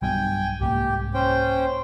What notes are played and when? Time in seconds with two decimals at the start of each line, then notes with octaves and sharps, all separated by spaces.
0.02 B1 G2 B2 G5 G#5
0.61 C2 G#2 A#3 G4
1.14 C#4 C5 G5